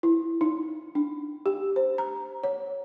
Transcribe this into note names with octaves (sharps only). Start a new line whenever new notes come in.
E4
D#4
D4
G4
C5
A#5
C#5